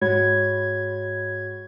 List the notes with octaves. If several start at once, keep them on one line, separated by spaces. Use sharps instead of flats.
G#2 G#3 F#4 C#5 B5 G#6